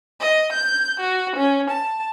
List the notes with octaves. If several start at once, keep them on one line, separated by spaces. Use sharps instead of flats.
D#5
G6
F#4
C#4
A5